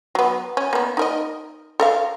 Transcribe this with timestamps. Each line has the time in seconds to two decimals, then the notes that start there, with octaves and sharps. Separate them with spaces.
0.15 F#3 B3
0.57 C#4
0.73 A#3 B3
0.97 D#4 A#4 D#5
1.80 A4 A#4 F5